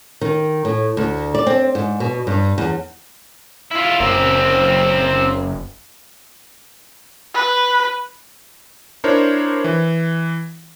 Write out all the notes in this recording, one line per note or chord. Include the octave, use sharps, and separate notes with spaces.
D#3
A2
D2
D5
C4
G#2
B2
G2
E2
E4 F4
F#1 C4 A#4
B4
D4 E4 A#4 C5 C#5
E3